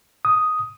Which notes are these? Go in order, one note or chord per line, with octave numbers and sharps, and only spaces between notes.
D#6